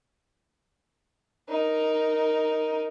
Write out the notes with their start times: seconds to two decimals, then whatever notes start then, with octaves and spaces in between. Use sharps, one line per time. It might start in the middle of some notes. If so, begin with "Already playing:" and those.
1.49 D#4 A#4